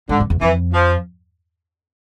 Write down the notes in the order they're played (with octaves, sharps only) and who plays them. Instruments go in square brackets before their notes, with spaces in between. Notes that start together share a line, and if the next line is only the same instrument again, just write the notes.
[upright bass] G#2 [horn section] D3
[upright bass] F2
E2
[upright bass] F2 [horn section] E3
[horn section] F3